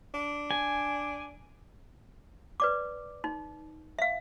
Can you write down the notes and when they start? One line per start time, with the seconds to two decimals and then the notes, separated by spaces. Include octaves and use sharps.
0.14 D4
0.51 G#5
2.60 B4 D5 D6
3.24 D#4
3.99 E5 F5